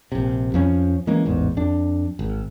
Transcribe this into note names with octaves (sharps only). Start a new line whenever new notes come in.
A#1 C3
F2 F3 C#4
E3 G#3 A#3 C#4
A1 E2 G#2
F2 D4
G#1